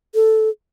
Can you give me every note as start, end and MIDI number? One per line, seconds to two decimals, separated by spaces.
0.15 0.49 69